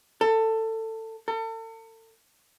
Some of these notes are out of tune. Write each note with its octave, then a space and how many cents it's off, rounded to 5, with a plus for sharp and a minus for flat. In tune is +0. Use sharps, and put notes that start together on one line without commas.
A4 +20
A4 +40